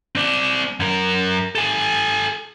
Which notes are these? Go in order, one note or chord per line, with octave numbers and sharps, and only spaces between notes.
C4 D5
F#2 A#4
A4 G#5